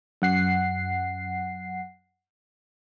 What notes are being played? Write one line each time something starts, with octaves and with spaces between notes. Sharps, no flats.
F#2 F#5 C7